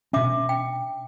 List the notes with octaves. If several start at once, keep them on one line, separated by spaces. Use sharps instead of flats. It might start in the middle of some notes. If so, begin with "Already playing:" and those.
B2 C#4 D4 E5 D6
G5